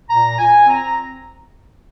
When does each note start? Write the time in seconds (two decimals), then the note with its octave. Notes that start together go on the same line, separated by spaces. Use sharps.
0.09 A#2 A#5
0.38 A#2 G#5
0.67 C4 A#5